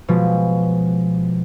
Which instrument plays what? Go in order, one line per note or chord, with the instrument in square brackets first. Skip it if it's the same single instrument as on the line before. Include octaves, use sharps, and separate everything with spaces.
[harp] B2 F3 G#3